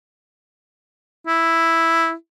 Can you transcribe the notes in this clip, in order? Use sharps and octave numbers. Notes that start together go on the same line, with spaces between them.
E4